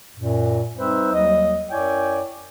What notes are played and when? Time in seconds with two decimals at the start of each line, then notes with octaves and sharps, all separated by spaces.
0.16 F#2 A#2
0.76 G3 C4 D#4 B4 C5 E5
1.13 D#2 F#3 G3 D#5
1.70 F#2 E4 C#5 D5 G5 G#5